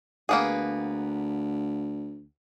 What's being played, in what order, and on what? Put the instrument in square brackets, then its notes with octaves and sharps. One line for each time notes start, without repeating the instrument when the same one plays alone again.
[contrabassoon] D2 [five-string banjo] A#3 B3 G#4